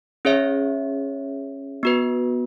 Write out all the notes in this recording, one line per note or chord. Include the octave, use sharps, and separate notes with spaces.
C#4 G#4 C#5 E5
B3 F#4 B4